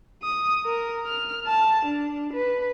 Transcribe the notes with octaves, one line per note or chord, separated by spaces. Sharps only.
D#6
A#4
F6
A5
D4
B4